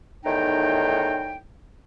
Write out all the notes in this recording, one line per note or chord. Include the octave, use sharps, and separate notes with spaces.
E2 A2 D#3 D#4 G5